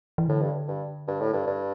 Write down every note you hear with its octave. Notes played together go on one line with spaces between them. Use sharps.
E3
A2 D3
G2
G2
G2
A2
G2
G2